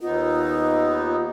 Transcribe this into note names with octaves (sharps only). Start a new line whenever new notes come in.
D#2 B3 D#4 F4